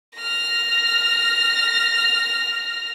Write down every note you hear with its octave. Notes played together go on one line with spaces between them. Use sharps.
F6 A#6